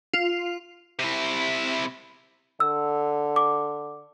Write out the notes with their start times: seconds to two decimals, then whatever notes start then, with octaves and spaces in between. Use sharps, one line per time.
0.13 F4
0.99 C3 E4
2.60 D3 E6
3.36 D6